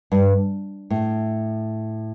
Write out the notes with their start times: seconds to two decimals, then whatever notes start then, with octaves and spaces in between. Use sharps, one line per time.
0.12 G2
0.90 A2